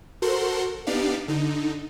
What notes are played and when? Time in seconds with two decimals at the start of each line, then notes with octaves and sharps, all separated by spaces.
0.22 F#4 A4 A#4 C5 F#5 C6
0.87 B3 D4 D#4 G4 D5 F5
1.28 D3 D#4